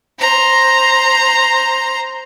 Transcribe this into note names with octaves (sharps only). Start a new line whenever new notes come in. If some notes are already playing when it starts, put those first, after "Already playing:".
C5 A#5